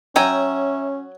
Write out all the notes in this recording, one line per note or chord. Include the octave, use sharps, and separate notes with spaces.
F#3 C#4 E5 G5 G#5 A#5